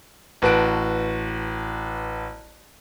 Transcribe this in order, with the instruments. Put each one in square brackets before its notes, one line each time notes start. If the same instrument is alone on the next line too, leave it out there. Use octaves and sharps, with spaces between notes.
[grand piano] A1 F#4 B4 A5 F#6 D7